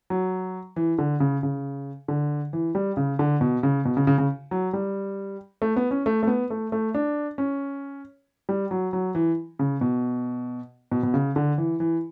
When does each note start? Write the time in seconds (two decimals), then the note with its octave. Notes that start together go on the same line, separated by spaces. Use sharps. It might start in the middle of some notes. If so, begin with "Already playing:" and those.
0.10 F#3
0.76 E3
0.98 D3
1.20 C#3
1.43 C#3
2.08 D3
2.53 E3
2.75 G3
2.97 C#3
3.19 D3
3.41 B2
3.63 C#3
3.85 B2
3.97 C#3
4.07 C#3
4.18 C#3
4.51 F#3
4.73 G3
5.62 A3
5.76 B3
5.91 C#4
6.06 A3
6.23 A3
6.27 B3
6.50 A3
6.72 A3
6.95 D4
7.38 C#4
8.49 G3
8.71 F#3
8.93 F#3
9.15 E3
9.59 C#3
9.81 B2
10.92 B2
11.03 B2
11.14 C#3
11.36 D3
11.58 E3
11.80 E3